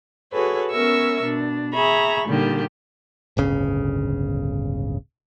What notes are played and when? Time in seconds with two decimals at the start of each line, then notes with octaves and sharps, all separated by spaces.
0.33 F#4 G#4 A4 B4 C#5
0.71 B3 C#4 A#4 E5 C#6 E6
1.22 B2 D4
1.74 G#4 E5 A#5 B5 C#6
2.26 A#2 D3 D#3 G3 G4
3.37 D1 G1 C#3